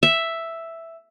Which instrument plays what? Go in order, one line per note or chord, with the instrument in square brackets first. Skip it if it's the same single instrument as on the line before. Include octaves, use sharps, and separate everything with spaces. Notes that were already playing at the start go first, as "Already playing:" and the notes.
[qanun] E5